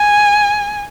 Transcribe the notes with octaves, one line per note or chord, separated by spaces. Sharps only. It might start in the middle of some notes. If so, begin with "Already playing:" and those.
Already playing: G#5